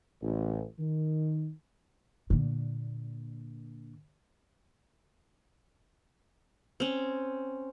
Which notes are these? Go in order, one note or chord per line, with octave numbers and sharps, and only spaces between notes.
A1
D#3
A#2 D3
C4 C#4